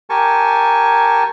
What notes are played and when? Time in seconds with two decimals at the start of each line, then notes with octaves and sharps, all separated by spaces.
0.10 G4 A#4 G#5 A5 C#6